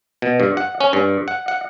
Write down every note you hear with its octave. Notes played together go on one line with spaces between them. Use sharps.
B2
G2
F#5
C#4
G2
F#5
F#5